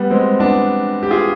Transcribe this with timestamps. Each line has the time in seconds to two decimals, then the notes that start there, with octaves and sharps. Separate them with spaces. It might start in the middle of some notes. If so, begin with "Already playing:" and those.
Already playing: G3 B3
0.10 G#3 C4
0.39 B3 D4
1.03 G4
1.11 F4 G#4